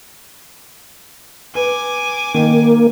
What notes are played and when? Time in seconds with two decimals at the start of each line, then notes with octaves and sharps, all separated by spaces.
1.55 B4 G#5 D6
2.34 D#3 A#3